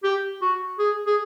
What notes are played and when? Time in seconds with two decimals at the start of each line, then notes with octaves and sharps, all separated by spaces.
0.04 G4
0.42 F#4
0.79 G#4
1.06 G#4